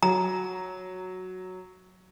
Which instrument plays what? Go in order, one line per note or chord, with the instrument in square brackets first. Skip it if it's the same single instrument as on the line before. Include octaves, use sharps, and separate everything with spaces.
[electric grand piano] F#3 [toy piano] A#5